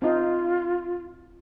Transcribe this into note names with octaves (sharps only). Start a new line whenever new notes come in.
C4 D#4 F4